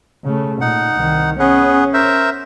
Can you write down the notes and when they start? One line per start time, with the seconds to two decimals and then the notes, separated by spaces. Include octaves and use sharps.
0.25 C#3 A3
0.61 A#2 D#4 F#5
0.94 C2 D#3
1.39 B3 C#4 G#4 B4
1.94 A#4 C5 E5